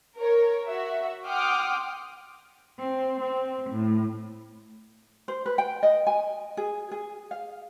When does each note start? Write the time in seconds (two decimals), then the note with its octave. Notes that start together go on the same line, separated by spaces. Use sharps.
0.17 A#4 C#5
0.67 F#4 E5
1.26 F#5 G5 C6 D6 D#6 F6
2.80 C4
3.21 C4
3.71 A2
5.28 C5
5.46 B4
5.58 G5
5.83 D#5
6.07 G#5
6.57 G#4
6.91 G#4
7.31 F5